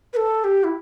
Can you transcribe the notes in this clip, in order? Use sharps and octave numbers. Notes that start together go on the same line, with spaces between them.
B4
A4
G4
E4